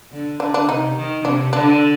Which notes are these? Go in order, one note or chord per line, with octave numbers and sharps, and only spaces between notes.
D3
D3 D4
D4
C3 D#4
D#3
C3 D4
D3 D4